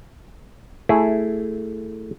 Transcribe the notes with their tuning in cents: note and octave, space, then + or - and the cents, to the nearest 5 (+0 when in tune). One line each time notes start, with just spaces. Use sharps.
A3 +10 E4 +0 G#4 +0